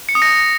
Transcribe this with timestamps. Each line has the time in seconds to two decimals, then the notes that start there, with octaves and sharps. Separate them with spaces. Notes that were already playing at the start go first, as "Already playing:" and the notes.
0.09 C#7
0.15 D#6
0.22 A#6